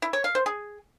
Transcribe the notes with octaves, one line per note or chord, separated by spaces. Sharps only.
E4
C#5
F5
C5
G#4